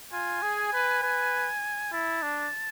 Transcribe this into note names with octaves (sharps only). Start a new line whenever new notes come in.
F4 G#5
G#4
B4
B4
E4 A5
D4